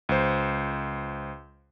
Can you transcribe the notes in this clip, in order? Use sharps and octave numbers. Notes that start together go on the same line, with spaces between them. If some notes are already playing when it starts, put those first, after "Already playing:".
C#2 C5